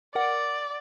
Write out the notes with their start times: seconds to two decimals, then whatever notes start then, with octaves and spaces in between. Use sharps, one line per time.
0.15 A#4 D5 F#5